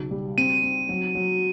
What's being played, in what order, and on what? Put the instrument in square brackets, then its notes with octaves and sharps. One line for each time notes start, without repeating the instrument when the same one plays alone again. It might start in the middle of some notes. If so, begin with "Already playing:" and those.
Already playing: [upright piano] B1 C#3
G3
[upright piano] C4 [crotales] D#7
[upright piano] C4
F#3
F#3